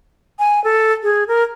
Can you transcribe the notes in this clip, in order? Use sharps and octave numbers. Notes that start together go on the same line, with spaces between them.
G#5
A4
G#4
A#4